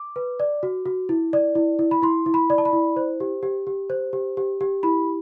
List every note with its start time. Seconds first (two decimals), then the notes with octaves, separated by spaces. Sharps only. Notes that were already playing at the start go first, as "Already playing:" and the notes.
Already playing: D6
0.16 B4
0.40 D5
0.63 F#4
0.86 F#4
1.09 E4
1.33 D5
1.55 E4
1.79 E4
1.91 B5
2.02 E4 C6
2.26 E4
2.34 B5
2.50 D5
2.58 A5
2.65 B5
2.73 E4
2.96 C5
3.20 G4
3.43 G4
3.67 G4
3.90 C5
4.13 G4
4.37 G4
4.61 G4
4.83 E4 B5